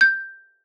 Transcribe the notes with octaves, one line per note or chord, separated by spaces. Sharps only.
G6